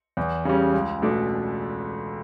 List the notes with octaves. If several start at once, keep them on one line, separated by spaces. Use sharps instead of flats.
E2
C#3 G3 C#4
C#2
B2 A3 D4